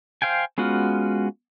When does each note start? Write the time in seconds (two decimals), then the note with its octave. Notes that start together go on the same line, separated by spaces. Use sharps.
0.22 C5 F5 G5 G#5
0.58 G#3 B3 C#4 F4 F#4